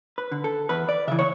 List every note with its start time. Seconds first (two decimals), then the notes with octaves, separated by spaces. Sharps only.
0.18 B4
0.32 D3
0.44 A4
0.69 E2 B4
0.89 D5
1.08 C#3 E3 E5
1.19 C#5